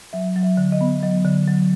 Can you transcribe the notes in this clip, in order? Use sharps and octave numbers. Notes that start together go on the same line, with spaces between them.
F#3 E5
F#3
E5
D3
D#5
B3
F#3 D#5
D3
F#3